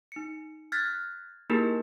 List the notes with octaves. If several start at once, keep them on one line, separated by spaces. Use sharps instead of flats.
D#4 C#7
F6 F#6 G#6 A6 B6
A#3 D#4 E4 G4 G#4 A#4